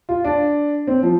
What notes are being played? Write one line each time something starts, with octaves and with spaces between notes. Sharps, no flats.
F4
D4
C4
F3